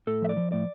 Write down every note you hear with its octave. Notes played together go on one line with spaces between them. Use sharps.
A2 A4
F3 E5
D5
F3
A2 D5